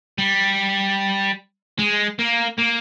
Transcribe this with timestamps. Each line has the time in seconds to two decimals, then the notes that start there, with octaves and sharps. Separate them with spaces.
0.18 G3
1.79 G#3
2.19 A#3
2.59 A#3